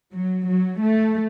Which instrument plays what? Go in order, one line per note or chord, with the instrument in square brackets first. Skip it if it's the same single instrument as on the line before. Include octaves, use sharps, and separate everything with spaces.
[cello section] F#3
F#3
A3